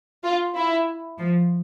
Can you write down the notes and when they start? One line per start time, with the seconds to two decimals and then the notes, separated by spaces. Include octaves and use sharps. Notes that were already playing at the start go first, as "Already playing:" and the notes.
0.24 F4
0.55 E4
1.18 F3